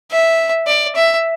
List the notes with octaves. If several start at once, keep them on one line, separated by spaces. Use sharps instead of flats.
E5
D5
E5